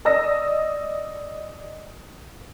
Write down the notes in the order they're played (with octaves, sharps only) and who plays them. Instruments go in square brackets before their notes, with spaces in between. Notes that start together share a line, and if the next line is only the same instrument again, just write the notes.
[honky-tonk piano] D5 D#5 D#6 E6 A#6